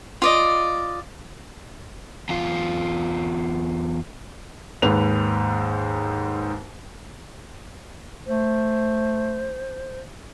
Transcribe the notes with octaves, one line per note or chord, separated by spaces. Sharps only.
F4 D5 D#5
E2 F4
D#2 G#2 B4 F7
A3 C5